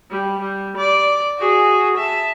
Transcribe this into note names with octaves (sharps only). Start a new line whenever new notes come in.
G3
G3
D5
F#4 G#4
E5 A5